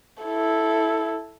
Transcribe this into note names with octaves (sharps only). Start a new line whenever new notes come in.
E4 A4